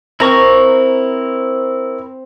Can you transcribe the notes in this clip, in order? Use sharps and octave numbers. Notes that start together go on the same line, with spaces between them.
C4 E4 A#4 C5 A#5 C#6